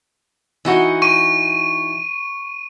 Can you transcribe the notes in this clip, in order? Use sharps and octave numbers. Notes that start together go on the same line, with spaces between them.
E3 D#4 F#4
C#6 D#7